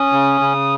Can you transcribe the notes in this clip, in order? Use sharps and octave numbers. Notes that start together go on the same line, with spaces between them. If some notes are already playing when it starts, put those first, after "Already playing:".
Already playing: C#4 D#6
C#3
C#3